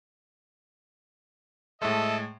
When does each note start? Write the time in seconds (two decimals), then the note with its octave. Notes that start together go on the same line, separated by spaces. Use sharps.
1.82 A2 G#3 A4 D#5 E5